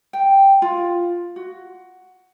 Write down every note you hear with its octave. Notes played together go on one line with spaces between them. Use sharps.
G5
F4
F#4